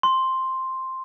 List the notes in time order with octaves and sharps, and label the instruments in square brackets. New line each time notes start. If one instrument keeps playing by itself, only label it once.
[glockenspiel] C6